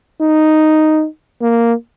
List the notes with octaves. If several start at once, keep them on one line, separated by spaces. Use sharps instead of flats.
D#4
A#3